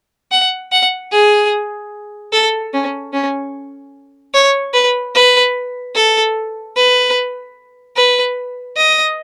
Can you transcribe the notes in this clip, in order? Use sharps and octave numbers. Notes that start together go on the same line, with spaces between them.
F#5
F#5
G#4
A4
C#4
C#4
C#5
B4
B4
A4
B4
B4
D#5